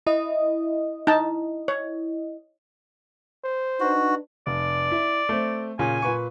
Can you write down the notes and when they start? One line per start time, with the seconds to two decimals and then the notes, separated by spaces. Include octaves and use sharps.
0.07 E4 D#5
1.07 D#4 A5
1.68 C#5
3.44 C5
3.80 D4 D#4 F#4 B4
4.47 F1 D5
4.91 E4
5.29 A3 C4
5.79 A#2 C#3 C#4 G#5
6.02 A#2 B4 C#6